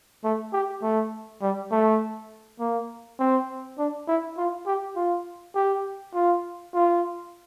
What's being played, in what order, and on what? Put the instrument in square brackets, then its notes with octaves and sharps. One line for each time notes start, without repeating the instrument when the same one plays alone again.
[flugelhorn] A3
G4
A3
G3
A3
A#3
C4
D4
E4
F4
G4
F4
G4
F4
F4